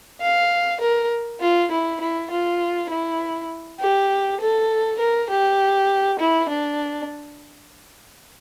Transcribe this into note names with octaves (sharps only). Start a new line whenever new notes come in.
F5
A#4
F4
E4
E4
F4
E4
G4
A4
A#4
G4
E4
D4